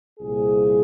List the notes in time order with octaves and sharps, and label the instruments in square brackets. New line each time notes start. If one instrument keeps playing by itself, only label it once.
[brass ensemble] C2 A#2 F3 G#4